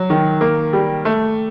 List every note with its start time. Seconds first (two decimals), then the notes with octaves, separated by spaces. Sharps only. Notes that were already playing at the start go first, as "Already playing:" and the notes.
Already playing: F#3
0.10 D#3
0.41 A#3
0.73 G3
1.05 A3